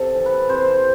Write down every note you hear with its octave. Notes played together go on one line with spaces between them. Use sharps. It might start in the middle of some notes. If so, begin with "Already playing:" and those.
Already playing: C3 A4
E3
B4
C3 C5